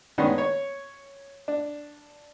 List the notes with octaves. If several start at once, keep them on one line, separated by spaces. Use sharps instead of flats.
D#3 G#3 B3 C#4 D4
C#5
D4